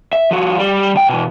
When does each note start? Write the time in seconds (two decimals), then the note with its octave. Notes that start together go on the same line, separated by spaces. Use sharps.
0.13 E5
0.31 F3 F#4
0.58 G3
0.95 D2 G5
1.09 B2 E3